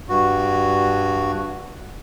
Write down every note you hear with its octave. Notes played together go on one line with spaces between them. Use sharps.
G2 F#4